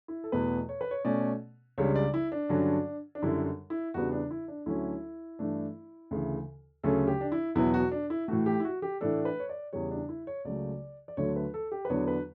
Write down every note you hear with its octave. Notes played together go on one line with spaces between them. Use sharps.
E4
A4
E2 B2 A3 B4
C#5
B4
C#5
B2 A3 C#4 D5
C#2 C#3 G3 D4 C#5
D5
E4
D4
G2 D3 F#3 C#4
D4
F#2 D3 G3 E4
E4
E2 C#3 G3 B3 D4 F#4
D4
E4
D4
D2 D3 F#3 C#4 E4
G2 E3 A3 D4
D2 C#3 E3
D2 C#3 F#3 C#4 A4
G4
D4
E4
E2 B2 F#3 B3 E4
F#4
D4
E4
A2 E3 A3 F#4
G4
E4
F#4
G4
A2 E3 A3 D4 A4
B4
C#5
D5
E2 C#3 G3 C#5
D4
E4
C#5
C#2 C#3 F#3 A3 D5
D5
D2 D3 F#3 A3 C#5
B4
A4
G4
B4
E2 D3 F#3 B3 D4 C#5
B4